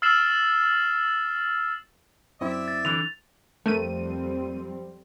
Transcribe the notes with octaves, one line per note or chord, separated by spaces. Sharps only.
E6 F6 A6 C7 E7 F#7
F#2 C4 E4 D5 E5
A6
D3 E3 F7
F2 G3 A3 A#3 C4 D#7